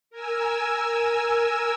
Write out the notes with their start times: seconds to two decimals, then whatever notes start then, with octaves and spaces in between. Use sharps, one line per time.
0.10 A#4 G#5 E6